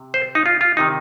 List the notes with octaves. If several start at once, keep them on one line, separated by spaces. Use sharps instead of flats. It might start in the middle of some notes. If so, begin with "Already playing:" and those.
Already playing: C3
C5
D#4
F4
F4
C3 D#3 D#4